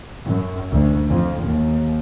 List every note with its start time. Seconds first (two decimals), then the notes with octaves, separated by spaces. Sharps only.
0.24 F#2
0.70 D2
1.08 F2
1.43 D#2